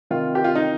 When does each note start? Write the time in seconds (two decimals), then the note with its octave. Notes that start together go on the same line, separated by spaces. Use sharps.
0.11 C3 D#3 F4
0.35 G4
0.44 F4
0.55 D#4